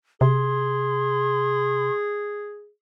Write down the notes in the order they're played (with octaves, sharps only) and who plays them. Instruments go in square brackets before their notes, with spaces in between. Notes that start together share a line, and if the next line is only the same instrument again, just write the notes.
[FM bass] C3 [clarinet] G#4 [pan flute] C6